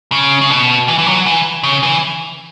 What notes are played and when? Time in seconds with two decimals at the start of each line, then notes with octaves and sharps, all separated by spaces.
0.12 C#3
0.41 C#3
0.50 B2
0.88 E3
0.98 E3
1.07 F#3
1.26 E3
1.63 C#3
1.83 E3